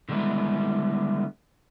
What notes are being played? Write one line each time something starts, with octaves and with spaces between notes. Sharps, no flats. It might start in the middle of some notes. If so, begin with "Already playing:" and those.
D3 D#3 G3 G#3 B3 E4